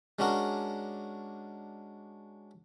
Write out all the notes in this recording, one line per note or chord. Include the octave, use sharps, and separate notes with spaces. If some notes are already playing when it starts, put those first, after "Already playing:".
G#3 C#4 D4 F#4 A#4